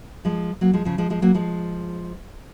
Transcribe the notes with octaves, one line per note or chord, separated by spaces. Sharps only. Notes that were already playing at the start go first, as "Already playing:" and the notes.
F3 G#3
F#3 A#3
F3 G#3
C#3 F3
F3 G#3
F3 G#3
F#3 A#3
F3 G#3